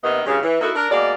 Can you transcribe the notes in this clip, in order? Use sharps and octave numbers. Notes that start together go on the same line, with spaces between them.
D#2 C3 D#3 B3 D#5
G2 A#2 C#3
E3
A#3 D#4 E4 F#4 A4
D4 A#4
B2 G#3 A#3 D5